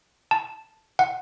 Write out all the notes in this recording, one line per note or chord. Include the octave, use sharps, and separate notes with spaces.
A5
F#5